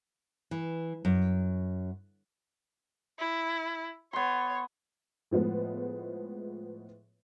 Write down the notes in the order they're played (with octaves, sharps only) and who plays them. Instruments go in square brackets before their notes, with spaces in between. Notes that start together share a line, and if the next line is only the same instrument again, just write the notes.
[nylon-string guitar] E3
F#2
[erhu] E4
[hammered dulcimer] B3 C6 [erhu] C#5
[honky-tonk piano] A2 F3 G#3 B3